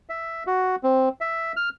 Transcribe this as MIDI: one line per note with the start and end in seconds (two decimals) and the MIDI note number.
0.09 0.44 76
0.47 0.76 66
0.83 1.09 60
1.21 1.52 76
1.56 1.69 89